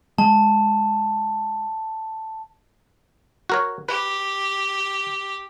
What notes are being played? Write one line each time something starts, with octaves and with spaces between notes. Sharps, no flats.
G#3 A5
F#4 A#4 C#5
G4 B4